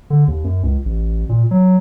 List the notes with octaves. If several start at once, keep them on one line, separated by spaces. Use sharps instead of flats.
D3
D#2
F#2
C#2
A1
A#2
F#3